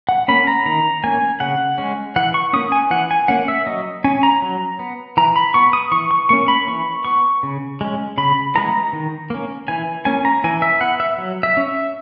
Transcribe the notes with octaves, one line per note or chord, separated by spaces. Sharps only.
F#5
A#3 C#4 B5
A#5
D#3 A#5
A#3 C#4 G#5
C#3 F#5
G#3 C#4
E3 F#5
C#6
A#3 C#4 D#6
G#5
E3 F#5
G#5
A#3 C#4 F#5
E5
F#3 D#5
C#4 G#5
A#5
F#3
B3
E3 A#5
B5
B3 C#6
D#6
E3 C#6
C#6
A#3 C#4 C#6
B5
E3 C#6
B3 C#6
C#3
G#3 C#4
C#3 B5
E3 G#3 B3 A#5
D#3
A#3 C#4
E3 G#5
A#3 C#4 G#5
A#5
E3 G#5
E5
B3 F#5
E5
F#3
E5
C#4
E5